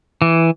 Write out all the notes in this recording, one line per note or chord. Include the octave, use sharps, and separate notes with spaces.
E3